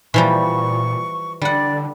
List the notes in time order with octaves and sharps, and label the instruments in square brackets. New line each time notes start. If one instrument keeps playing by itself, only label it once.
[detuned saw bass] A#2 [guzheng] E3 F3 G3 [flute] C#6
[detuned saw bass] D3 [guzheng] G3 F#5 [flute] D5